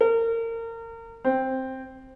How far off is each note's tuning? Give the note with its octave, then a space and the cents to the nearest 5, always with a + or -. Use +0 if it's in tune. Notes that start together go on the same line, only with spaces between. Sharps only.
A#4 -30
C4 +5